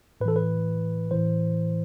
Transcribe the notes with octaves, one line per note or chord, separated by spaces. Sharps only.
A2 E3 A4 B4
B4
A2 E3 C5